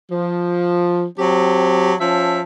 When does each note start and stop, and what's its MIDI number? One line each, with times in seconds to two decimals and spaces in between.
0.12 1.06 53
1.19 1.94 54
1.19 1.94 60
1.19 1.94 67
1.19 1.94 81
2.01 2.41 53
2.01 2.41 61
2.01 2.41 76
2.01 2.41 81